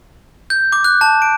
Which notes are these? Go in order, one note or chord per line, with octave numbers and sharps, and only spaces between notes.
G6
D6
F#6
A5
D7